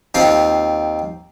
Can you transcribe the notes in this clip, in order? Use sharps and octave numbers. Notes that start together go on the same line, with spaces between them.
D#2 C4 F4